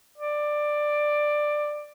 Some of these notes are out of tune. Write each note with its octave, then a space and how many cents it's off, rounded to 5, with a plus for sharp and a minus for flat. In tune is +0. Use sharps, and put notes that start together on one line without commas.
D5 +15